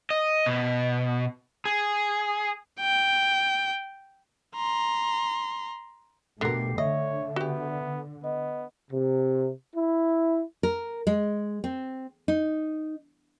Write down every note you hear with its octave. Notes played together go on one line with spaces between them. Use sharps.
D#5
B2
G#4
G5
A#5 C6
B2 D3 A3 G4 A#4 C7
D3 C#5 D#5 E5
B3 F#4 G4
B3 D#5
C3
E4
A#4
G#3
C4
D#4